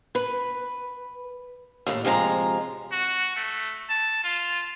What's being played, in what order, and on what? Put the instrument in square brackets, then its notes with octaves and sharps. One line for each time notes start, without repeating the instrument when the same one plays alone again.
[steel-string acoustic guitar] B4
D#2 A2
C3 F3 G#3 A#5
[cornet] F#4
A3
A5
F4